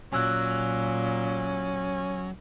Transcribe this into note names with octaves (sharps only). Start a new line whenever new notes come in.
A#2 F#3 C#4 G#5 E6 F#6